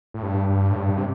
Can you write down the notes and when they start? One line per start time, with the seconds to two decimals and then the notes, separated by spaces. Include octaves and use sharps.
0.14 A2
0.23 G2
0.49 G2
0.71 A2
0.77 G2
0.97 C3